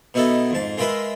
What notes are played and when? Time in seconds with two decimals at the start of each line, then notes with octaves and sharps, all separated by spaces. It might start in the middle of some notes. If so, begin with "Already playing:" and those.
0.14 B2 B3 D#4 E4 A4
0.51 F2 G#2 A5
0.78 G#3 F4 A#4 B4 E5